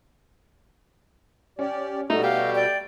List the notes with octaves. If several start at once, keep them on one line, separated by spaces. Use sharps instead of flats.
C#4 G4 D5
B2 G3 A3 D#4 F#4
G4 F5
D5 G5